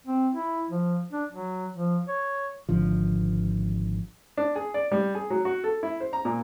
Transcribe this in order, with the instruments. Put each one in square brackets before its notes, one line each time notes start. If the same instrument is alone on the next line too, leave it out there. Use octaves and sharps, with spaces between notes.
[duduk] C4
E4
F3
D4
F#3
F3
C#5
[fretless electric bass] G#1 D3 F3
[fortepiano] D4
G#4
D5
G3
G#4
F#3
F#4
A4
E4
C5
A#5
A#2